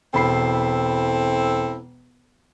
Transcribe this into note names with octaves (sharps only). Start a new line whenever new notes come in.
E1 C4 E4 A4 B5 C7